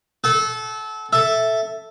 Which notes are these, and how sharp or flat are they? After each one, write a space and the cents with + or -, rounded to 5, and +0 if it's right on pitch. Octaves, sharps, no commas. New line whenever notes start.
A4 -25 F#5 +40
A4 +0 E5 +0